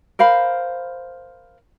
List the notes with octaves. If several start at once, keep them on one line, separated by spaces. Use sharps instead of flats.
A#4 C5 F5 B5